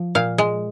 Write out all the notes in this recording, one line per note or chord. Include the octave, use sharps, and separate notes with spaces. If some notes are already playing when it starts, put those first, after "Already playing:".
Already playing: F3
A#2 F5
G#3